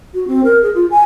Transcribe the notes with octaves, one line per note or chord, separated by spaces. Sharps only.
F#4
C4
A#4
G#4
F4
G#5